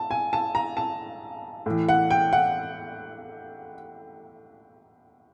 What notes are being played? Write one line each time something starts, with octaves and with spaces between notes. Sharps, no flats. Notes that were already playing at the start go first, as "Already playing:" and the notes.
Already playing: A5
G#5
A5
A#5
A5
A2 E3
F#5
G5
F#5